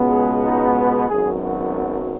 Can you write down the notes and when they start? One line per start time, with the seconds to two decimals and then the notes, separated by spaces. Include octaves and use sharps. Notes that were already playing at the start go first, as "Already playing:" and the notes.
Already playing: C#2 B2 G#3 B3
0.11 G#4
0.43 D#4
0.76 B4
1.08 G#1 F#2 F#3 B3 G#4
1.41 F#4